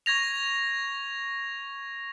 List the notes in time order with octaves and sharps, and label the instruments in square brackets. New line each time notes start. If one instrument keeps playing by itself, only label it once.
[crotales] C#6 G#6 A#6 F7